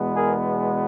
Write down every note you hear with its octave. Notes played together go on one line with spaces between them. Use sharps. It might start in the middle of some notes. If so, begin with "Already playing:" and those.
Already playing: E2 B2 G#3 B3
G#4 A#4